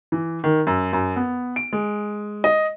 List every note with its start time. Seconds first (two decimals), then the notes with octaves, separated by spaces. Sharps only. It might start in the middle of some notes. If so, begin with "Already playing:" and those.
0.12 E3
0.44 D#3
0.67 F#2
0.93 F#2
1.16 B3
1.56 D7
1.73 G#3
2.44 D#5